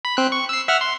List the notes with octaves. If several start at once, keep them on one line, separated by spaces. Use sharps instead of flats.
B5
C4 F#6
C#6
E6 C7
E5 F#5 F6
C6